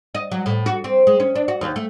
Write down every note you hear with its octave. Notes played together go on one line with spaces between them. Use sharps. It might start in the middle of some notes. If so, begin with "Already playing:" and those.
D#5
F#3
A2
F#4
C4
G#3
C#4
D4
F#4
D#2
A3